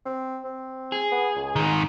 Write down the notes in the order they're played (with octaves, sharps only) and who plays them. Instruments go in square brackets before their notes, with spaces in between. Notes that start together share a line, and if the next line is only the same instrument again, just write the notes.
[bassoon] C4
C4
[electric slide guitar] G#4
[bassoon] B3
C#2
[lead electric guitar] G#2 D#3